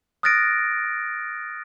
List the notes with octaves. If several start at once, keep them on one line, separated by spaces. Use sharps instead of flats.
D#6 F6 F#6 A6 A#6 D7